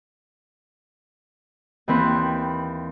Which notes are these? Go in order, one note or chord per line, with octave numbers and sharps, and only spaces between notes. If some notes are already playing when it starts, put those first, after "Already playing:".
D#2 E3 C4 B4